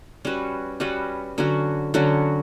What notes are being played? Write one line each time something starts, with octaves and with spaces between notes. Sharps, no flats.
G3 C#4 F#4 B4
G3 C#4 F#4 B4
D3 F#3 C#4 F#4
D3 F#3 C#4 F#4